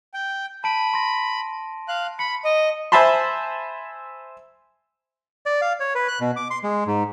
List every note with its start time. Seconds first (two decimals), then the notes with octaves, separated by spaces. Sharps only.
0.14 G5
0.64 A5 B5 D7 D#7
0.94 C6 A#6
1.88 F5 F#6
2.19 B5 C#7
2.45 D#5
2.92 C5 E5 G#5 A5 B5 C6
5.46 D5
5.61 F5
5.80 C#5
5.95 B4
6.08 F#6
6.21 B2
6.36 D6
6.51 C6
6.63 G#3
6.87 G#2